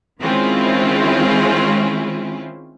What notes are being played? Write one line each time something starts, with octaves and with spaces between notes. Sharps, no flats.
D#3 G#3 C4 C#4 E4 F4